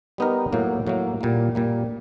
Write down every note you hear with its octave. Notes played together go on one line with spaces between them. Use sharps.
G3 B3 D#4 G4 A#4
A2 F#3 A#3
A2 F#3 A#3
A#2 G3 A#3
A#2 G3 A#3